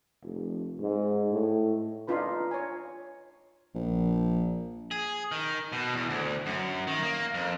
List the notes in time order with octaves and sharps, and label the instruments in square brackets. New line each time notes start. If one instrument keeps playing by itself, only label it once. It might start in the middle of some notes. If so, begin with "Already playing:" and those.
[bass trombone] F1
G#2
A2
[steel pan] D4 D#4 F4 B4 B5
C#5 G#5
[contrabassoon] A#1
[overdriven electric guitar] G#4
D#3
B2
E2
D2
F#2
D#3
A#3
F2